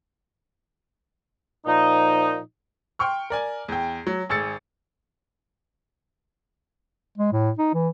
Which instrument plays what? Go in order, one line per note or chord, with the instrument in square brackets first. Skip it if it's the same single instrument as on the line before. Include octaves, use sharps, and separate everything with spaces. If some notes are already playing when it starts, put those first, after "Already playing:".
[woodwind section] A#2 F3 D#4
[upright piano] G5 C6 C#6 F6
A#4 D5 G#5
E2 G5
F#3
G#1 G#4 E6 A6 C#7
[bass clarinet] G#3
A2
D#4
E3